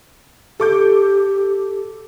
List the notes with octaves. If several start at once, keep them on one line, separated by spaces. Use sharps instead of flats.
G4 A4 D6 G6